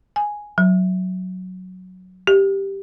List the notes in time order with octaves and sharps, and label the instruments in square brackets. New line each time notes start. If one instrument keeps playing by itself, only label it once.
[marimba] G#5
F#3
G4